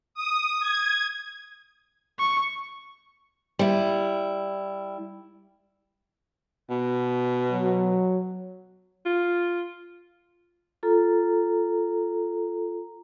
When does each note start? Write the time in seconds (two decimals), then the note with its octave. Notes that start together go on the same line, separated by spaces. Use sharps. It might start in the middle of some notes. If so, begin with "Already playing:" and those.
0.14 D#6
0.60 G#6
2.19 C#6
3.59 G3 E4
6.70 B2
7.52 F#3
9.05 F4
10.83 F4 A4 A#5